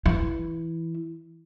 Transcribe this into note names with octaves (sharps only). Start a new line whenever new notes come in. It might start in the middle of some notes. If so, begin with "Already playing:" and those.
E3 E4